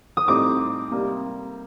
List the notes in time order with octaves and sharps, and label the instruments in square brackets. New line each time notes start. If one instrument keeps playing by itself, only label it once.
[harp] D#6
[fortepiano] A2 G3 C4 D#4 [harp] D6
[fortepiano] C3 G3 A#3